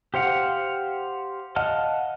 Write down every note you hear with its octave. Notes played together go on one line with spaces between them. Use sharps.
G4 C5 F5 F#5
D#5 F5 F#5 A5 F6